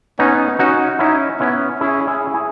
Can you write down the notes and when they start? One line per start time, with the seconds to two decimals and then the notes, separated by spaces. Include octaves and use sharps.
0.19 B3 C#4 D#4
0.59 C#4 D#4 F#4
0.99 C#4 D#4 E4
1.40 B3 C#4 E4
1.81 C#4 E4 G#4
2.07 E4 G#4
2.34 E4 G#4